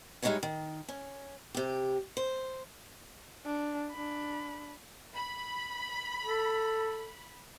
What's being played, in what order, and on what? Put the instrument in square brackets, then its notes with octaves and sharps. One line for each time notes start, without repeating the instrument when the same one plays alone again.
[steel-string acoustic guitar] G3 G#3 D#4 E4 C#5 G#5
D#3
C#4
C3 G4
C5
[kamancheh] D4
D4 B5
[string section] B5
[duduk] A4